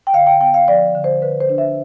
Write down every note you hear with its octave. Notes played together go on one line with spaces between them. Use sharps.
G5
D3 F5
G5
B3 G5
F5
F3 D5
D3
C5
D3 B4
C5
D4
E5